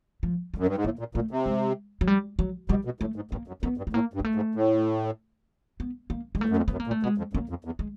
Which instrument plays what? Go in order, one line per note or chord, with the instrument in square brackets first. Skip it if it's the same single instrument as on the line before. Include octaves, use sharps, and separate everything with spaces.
[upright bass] F3
[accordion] F#2 [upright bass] G3
[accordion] G2
G#2
[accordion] A2 [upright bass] A#3
[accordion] A#2
[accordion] A#2 [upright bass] A3
[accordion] C3
[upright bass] G#3
F#3
G3
F#3
[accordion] B2 [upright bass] G3
[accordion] B2
[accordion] A2 [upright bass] A3
[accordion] G#2
[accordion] G2 [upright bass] A#3
[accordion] F#2
[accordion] F#2 [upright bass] B3
[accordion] G2
[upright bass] A3
[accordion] A2 [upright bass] A#3
[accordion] G2
[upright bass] G#3
A3
[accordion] G#2
A2
[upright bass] B3
A#3
G#3
[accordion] E2 [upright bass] A3
[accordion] F#2
F2
[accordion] F#2 [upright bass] B3
[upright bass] A#3
[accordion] A#2
[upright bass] A3
[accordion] B2 [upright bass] G#3
[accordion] F2
[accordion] F#2 [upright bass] A#3
[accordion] F2
E2
[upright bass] G#3